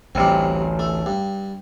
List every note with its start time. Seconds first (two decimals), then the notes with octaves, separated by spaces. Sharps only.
0.15 A1 D2 G3 C4
0.79 A3
1.06 G2